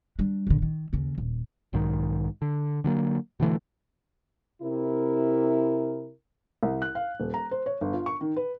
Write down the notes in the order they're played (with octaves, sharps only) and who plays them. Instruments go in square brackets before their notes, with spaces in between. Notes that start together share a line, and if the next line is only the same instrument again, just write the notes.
[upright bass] G3 D4
A#1 D3
D#3
D#2 C#3
D#1
[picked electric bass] B1 G#2 D#3
D3
D3 F#3 A#3
B2 D3 E3 A3
[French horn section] C3 E4 A#4
[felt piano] C2
F#6
F5
D#1
A#5
C5
C#5
G1
F4
C#6
D#3
B4